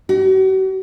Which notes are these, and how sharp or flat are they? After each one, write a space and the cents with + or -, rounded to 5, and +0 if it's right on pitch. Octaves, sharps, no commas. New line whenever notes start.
F#4 +45